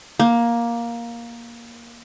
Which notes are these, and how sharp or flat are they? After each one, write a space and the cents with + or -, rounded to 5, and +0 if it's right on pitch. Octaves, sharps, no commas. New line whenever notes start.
A#3 +10